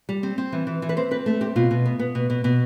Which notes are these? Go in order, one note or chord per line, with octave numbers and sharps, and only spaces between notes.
G3
C4
C4
E3
E3
E3
B4
C4 C5
C4 B4
A3 A4
C4 G4
B2 F4
B2
B3
B3
B2
B2
B2